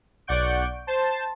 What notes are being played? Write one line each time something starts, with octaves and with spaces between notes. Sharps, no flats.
B1 D5 F#5 C#6 G6 D7
C5 A5